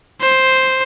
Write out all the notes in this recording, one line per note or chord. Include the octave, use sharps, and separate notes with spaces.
C5